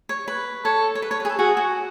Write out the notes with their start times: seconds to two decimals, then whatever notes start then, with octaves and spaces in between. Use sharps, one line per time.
0.09 C#5
0.28 B4
0.65 A4 C#5
0.95 C#5
1.02 B4
1.11 C#5
1.20 B4
1.25 G#4
1.30 A4
1.39 F#4 G#4
1.57 F#4